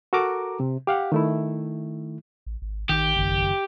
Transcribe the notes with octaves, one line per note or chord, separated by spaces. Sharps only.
F#4 A4 A#4 A#5 D6
C3
G4 F5 F#5
D#3 A3 E4
A1
G#1
A1 D#3 G4
F#1 D#3